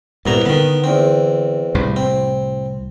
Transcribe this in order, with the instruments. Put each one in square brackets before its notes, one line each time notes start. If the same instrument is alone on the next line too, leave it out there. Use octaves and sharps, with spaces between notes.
[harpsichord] C2 B3 A#5 [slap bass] G2 A#2
[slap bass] D3 [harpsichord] D#3 B3
[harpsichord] E2 C4
[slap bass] C2 A2 C3
[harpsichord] C4